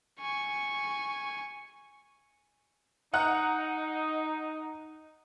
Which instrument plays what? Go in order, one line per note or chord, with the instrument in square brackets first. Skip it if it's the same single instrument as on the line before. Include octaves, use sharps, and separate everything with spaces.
[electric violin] G#5 C#6
[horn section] D#4 [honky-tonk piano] F#5 A#5 F#6